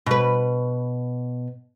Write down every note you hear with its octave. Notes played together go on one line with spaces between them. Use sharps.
B2 B4